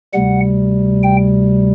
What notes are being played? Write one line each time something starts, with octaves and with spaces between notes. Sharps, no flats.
D2 C3 G3 F#5
G5